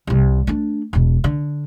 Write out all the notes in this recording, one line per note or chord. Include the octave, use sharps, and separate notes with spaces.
C2 C3
A3 D4
E1 B2
D3